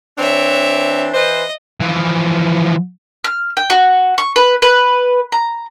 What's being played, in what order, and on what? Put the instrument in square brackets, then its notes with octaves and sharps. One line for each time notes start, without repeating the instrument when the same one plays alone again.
[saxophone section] E3 C4 D4 [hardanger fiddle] C#5 E5
[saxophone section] E3 B4 C5 [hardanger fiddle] D#5
[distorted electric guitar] E3 F3
[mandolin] F6
G5
F#4
C#6
B4
B4
A#5